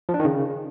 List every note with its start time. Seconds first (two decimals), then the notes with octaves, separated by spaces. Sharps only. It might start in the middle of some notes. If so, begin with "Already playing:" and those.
0.09 F3
0.14 D4
0.19 D#3
0.25 C#3